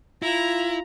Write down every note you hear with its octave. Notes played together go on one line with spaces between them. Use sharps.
E4 F4 A#5 F7